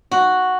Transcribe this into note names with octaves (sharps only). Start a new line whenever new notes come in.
F#4